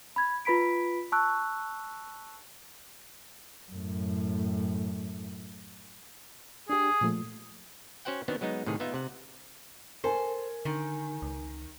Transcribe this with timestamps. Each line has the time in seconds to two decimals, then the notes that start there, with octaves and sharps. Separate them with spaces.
0.16 B5 G#6
0.45 F4 B4 B5 B6 D7
1.12 A5 C#6 E6 F#6
3.72 F#2 A2
6.69 D4 G4 G#4
7.01 A#2 F3 A3
8.05 C#4 F#4 C5 F#5 G5
8.28 D#3 B3 C4 D4 F#4
8.41 F#3 G#3 B3 D#4
8.66 A2 C3 D#3 G#4
8.80 B3 D#4 F4 E5
8.94 C3 F#5
10.04 A4 A#4 C5 G#5
10.65 D3 D#3
11.22 C#2